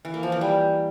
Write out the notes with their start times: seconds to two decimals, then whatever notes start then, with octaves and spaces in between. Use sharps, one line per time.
0.05 E3
0.14 A#3
0.23 F3
0.32 E3
0.41 G3